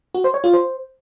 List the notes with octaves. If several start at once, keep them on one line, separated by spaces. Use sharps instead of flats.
F#4
C5
C#5
F4
C5